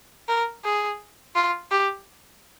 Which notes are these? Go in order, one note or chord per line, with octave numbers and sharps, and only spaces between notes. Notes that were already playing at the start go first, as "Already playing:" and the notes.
A#4
G#4
F4
G4